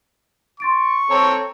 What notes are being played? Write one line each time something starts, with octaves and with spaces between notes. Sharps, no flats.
C6 C#6 A6 D7
C4 A4 C#5 A#5